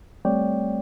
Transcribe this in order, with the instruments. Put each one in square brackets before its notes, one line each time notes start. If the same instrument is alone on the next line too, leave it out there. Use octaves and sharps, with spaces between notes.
[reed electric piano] G3 A3 C4 C#5 D5 G5